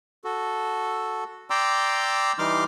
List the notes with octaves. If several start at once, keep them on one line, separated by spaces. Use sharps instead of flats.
F#4 A4
D5 G5 A#5 C6 D6 E6
E3 G3 D#4 C6 D6 F6